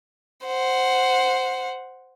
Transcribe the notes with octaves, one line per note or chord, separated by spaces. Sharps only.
C5 F#5